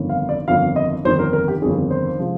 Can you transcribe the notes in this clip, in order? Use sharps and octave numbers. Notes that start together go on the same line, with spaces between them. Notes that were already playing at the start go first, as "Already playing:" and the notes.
Already playing: G1 F2 D#3
F5
D5
G1 F2 D#3 F5
D#5
G1 F2 D#3 C5
A#4
A#4
G4
G1 F2 D#3 G#4
C5
C3 F3 G#3